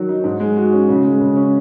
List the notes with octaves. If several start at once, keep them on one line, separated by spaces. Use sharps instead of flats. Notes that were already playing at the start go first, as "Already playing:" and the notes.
Already playing: D#3 F#3 F#4
D#4
G#2
G#3
F#4
C#4
C#3
G#3
C#3
C#4